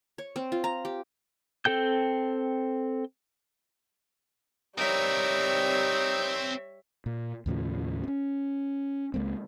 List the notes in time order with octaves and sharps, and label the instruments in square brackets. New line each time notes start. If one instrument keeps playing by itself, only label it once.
[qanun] C#5
C4
F4
A#5
G4
[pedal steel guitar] C4 A4 G5 G6
[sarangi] G3 [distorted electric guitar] C4 A#4 [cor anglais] D#4 [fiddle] C#5 E5
[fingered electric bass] A#2
D#2 A2 C#3 F3
C4 C#4
C#2 G#3 A#3 C4